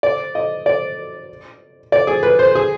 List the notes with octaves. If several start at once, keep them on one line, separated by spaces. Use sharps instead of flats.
D5
D#5
D5
D5
G#4
B4
C5
G#4